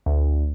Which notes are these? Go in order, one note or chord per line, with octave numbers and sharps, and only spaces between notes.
D2